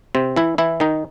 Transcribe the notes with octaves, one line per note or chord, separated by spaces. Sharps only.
C3 C4
E3 E4
E3 E4
D#3 D#4